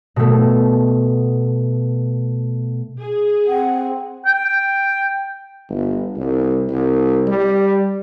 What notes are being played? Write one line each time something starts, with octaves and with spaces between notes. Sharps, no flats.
B2 A3
G#4
C4 F#5
G5
G1
C2
C2
G3